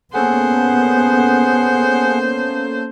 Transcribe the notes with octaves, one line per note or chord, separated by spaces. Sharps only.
A#3 B3 C#4 G#4 A4 C5 F#5